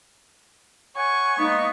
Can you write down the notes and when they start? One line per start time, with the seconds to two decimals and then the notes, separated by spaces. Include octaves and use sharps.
0.97 C#5 F#5 G#5 C#6
1.38 G#3 A#3 B3 D#4